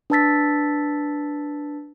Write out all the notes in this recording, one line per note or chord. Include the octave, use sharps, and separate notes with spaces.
D4 B4 A5 E6 A6 B6